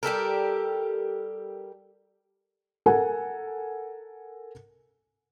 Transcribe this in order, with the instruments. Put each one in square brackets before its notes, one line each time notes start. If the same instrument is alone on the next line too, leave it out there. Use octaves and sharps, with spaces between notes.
[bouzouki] G3 G4 A4 A#4
[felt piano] A4 A#4 F#5 G#5